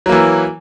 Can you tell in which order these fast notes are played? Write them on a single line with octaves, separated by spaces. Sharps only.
F#3 A#3 E3